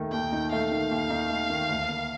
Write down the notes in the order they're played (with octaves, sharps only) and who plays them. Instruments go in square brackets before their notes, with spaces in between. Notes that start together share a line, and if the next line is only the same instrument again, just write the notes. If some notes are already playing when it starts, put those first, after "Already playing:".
Already playing: [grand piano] D#2 D#3 A3 D#4
[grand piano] D#2 [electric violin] G5
[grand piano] D#4
[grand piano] A3 [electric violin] F5
[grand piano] D#3
D#2
D#4
A3
D#3
D2
A#3